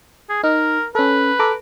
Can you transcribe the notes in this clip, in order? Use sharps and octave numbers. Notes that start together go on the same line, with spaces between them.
G#4
D#4 A#4
C#4 A4 B4
A4 A#5 D6